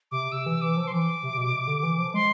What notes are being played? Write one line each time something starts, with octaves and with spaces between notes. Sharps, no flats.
C3 D6
C3 E6
E3
E3 D6
F3
C6
E3 D6
C3
C3
B2
C3
D3
D3
E3
F3
G#3 C6